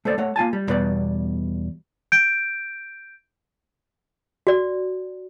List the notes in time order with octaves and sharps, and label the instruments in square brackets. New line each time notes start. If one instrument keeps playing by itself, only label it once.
[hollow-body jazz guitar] A3 A4 C5 D5
A3 C#5 F#5
A#3 F4 G#5 A5
G3
E2 B2 G3 B4 D5
[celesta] G6 D7
[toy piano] F#4 D5